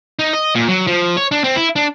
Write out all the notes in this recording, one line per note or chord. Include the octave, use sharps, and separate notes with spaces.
D#4
D#5
A#2
F#3
F3
C#5
D4
C4
E4
D4